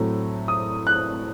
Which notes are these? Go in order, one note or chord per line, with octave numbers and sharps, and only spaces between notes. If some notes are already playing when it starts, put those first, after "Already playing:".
Already playing: A2 F#3 A3 C4
D#6
F#6